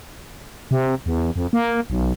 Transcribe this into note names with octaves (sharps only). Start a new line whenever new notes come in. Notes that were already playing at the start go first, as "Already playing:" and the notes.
C3
E2
F2
A#3
B1